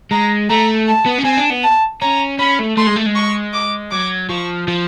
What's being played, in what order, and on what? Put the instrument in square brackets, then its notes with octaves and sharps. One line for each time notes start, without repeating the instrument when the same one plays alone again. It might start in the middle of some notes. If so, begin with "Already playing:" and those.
[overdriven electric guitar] G#3 [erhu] A#5
[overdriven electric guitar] A3 [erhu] A#5
[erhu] A5
[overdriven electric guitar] B3
C#4
[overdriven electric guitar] C4 [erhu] G#5
[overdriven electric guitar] D4
B3
[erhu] A5
[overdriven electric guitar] C#4 [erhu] A#5
[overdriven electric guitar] C#4 [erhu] B5
[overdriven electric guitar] A3
[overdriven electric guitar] A3 [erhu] C6
[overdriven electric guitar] G#3
A3
G#3
[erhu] C#6
D6
[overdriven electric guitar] F#3 [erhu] D6
[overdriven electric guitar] F3 [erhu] C#6
[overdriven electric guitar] F3